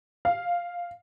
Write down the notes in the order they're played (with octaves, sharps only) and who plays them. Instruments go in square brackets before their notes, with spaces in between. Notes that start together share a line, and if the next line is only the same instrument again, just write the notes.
[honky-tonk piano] F5